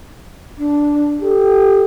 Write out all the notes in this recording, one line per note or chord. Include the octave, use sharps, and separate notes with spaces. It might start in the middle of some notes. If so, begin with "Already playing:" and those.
D4
G4 A4